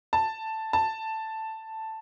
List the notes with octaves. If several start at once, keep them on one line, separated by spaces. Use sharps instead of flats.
A5
A5